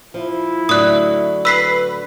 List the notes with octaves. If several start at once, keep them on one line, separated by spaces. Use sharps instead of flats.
F3 E4
A2 D3 F#3 D#6 F#6
B4 E6 B6 C7